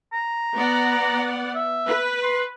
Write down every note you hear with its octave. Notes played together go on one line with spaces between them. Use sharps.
A#5
B3 D5 F#5
E5
B4
C6